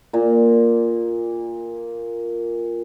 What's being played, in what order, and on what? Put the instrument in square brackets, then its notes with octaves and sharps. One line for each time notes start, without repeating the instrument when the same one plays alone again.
[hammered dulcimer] A#2 A#3